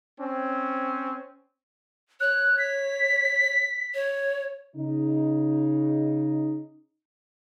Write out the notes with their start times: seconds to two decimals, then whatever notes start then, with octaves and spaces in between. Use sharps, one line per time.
0.20 C4 C#4
2.21 C#5 F#6
2.59 B6
3.94 C#5
4.76 C#3 D#4